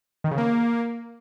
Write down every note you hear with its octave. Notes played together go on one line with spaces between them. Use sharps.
D#3
C#3
A#3